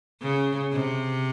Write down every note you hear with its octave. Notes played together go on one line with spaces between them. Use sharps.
C#3
C3